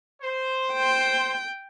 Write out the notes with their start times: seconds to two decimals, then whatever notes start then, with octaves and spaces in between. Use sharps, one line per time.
0.22 C5
0.74 G5